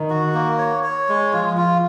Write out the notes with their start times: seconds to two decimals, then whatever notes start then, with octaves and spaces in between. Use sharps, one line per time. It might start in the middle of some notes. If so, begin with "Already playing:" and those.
Already playing: D#3
0.10 F#4
0.34 A#3
0.58 C#5
0.84 C#5
1.09 G#3
1.32 F3 F4
1.57 F4